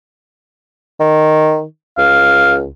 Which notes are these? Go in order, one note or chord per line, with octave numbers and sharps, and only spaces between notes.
D#3
C#2 F5